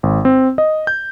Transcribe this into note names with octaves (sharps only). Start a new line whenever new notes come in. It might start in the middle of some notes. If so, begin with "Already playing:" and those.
G#1
C4
D#5
G6